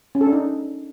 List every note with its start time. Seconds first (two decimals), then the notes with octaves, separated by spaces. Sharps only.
0.15 C#4
0.21 A4
0.27 D4
0.33 D#4